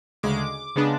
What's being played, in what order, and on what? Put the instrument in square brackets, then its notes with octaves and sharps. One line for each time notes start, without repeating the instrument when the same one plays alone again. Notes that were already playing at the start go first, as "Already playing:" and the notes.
[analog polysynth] D2 C#3 G#3 D6
C#3 G#3 B3 D4